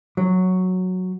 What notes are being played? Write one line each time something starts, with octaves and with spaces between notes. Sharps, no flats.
F#3